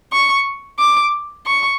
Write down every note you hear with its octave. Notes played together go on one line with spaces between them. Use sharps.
C#6
D6
C#6